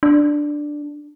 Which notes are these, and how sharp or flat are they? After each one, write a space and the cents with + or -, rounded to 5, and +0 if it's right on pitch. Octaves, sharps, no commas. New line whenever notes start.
D4 +5